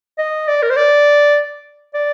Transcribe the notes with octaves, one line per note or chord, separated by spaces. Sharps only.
D#5
D5
A#4
C5
D5
D5